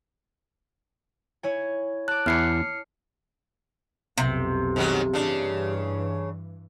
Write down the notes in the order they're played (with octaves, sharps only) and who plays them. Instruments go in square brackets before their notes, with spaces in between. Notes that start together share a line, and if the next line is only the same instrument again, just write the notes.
[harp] E4 C#5 G#5
[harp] A5 D6 [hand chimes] F#6
[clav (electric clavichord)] E2 E4 [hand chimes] F6 C7 C#7
[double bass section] B1 F2 [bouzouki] C3
[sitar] G#2 D#3 F#3
[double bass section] G2 E3 [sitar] C#3 D4